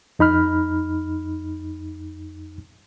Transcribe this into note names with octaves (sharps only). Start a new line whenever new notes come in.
F2 D#4 B5 F6